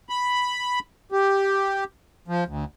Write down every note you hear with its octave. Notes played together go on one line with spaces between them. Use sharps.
B5
G4
F3
D2